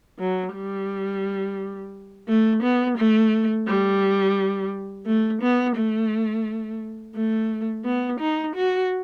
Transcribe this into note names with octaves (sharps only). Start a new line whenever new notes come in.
F#3
G3
A3
B3
A3
G3
A3
B3
A3
A3
B3
D#4
F#4